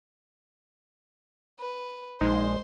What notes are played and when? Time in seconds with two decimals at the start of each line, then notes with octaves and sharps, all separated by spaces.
1.60 B4
2.21 A#1 G#3 D#4 C5 C6